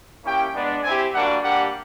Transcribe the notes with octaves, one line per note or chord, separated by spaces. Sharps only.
A#3 C#4 E4 G4 G5
G#3 B3 D4
C4 E4 G4 G#5
G3 A#3 D4 F#4 F#5
G3 A#3 D4 G4 F#5